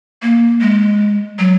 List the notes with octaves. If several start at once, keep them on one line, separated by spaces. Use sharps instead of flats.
A#3
G#3
F#3